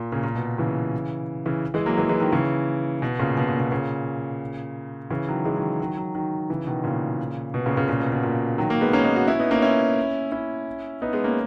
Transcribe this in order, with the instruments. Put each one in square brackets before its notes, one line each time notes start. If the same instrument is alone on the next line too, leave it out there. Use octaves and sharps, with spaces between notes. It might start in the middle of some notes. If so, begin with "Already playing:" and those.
Already playing: [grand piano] A#2
A#2 C#3
A#2
B2
C#3 E3
C#3 E3
E3 G#3
F#3 A#3
E3 G#3
E3 G#3
D#3 F#3
C#3 E3
B2
A#2 C#3
B2
A#2
B2
A#2 C#3
C#3 E3
D#3 F#3
E3 G#3
D#3 F#3
D#3 F#3
D#3 F#3
D#3 F#3
C#3 E3
B2 D#3
A#2 C#3
B2
A#2 C#3
A#2 C#3
A#2 C#3
B2
B2
A#2
D#3 F#3
F#3 A#3
G#3 B3
A#3 C#4
B3 D#4
D#4 F#4
C#4 E4
B3 D#4
A#3 C#4
C#4 E4
C#4 E4
B3 D#4
G#3 B3
A#3 C#4